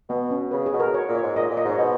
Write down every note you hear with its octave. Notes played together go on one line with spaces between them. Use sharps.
B2 B3
C#4
C#3 B4
G#4
B2
A#4
C#5
A#2
C#5
G#2
A#2 D#5
A#2
D#5
G#2
C#5
B2 D#5